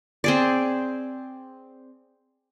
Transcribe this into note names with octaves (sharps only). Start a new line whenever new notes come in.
C4 G#4 D5